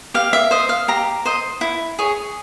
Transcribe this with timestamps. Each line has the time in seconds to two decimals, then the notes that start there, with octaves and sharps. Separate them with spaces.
0.14 G4 F5
0.33 E5
0.51 C5 D#5
0.69 F5
0.88 G4 A#5
1.25 C5 D#5
1.61 E4
1.99 G#4 C#5